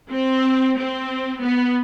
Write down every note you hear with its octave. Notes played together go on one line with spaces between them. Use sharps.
C4
C4
B3